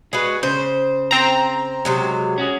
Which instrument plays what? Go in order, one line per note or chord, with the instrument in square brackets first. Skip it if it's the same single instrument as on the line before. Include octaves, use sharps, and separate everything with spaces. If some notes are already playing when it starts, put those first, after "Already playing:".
[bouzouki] G#3 F#4 [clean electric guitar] G#4 B4
[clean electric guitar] C#3 [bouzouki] C5
[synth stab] C4 A#5
[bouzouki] C3 F#3 G#3
[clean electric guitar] C#4 F#4 G#4